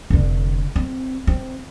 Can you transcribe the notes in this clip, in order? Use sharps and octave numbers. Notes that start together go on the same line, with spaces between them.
F1 D3
C4
C4